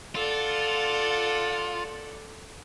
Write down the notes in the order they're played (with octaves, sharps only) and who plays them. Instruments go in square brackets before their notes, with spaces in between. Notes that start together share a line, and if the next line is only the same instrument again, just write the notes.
[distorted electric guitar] F4 [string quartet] A4 D5 F#5